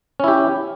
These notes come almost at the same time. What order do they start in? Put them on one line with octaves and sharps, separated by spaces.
C#4 E4 G4